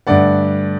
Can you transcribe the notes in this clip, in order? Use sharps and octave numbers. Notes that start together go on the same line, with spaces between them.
G2 D3 A3 D5 F#5